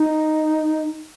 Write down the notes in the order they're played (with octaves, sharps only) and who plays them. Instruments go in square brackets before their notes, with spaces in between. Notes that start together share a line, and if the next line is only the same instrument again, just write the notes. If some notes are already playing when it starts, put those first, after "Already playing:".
Already playing: [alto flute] D#4